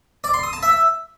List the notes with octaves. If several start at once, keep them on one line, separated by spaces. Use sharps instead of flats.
D5
C6
D#6
A5
E5